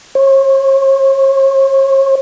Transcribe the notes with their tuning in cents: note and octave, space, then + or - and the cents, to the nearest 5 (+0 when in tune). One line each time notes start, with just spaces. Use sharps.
C#5 -40